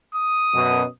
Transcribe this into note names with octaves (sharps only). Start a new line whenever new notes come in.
D#6
F#2 B2